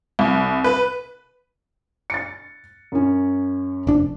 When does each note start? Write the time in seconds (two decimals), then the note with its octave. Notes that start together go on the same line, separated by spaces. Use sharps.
0.19 C2
0.64 B4
2.10 A6 C#7
2.92 F#2 C#4
3.87 F1 D4